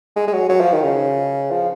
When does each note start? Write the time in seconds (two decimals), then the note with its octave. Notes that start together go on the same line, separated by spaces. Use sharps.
0.16 G#3
0.28 G#3
0.33 F#3
0.49 F#3
0.60 F3
0.73 D#3
0.83 C#3
1.51 F3